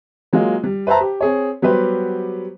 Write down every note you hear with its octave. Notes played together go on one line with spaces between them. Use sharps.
F#3 G#3 A#3 F4
G3
B4 C5 E5 A5 A#5
G4
C4 G#4 C#5
F#3 G3 B3 G4 B4 C5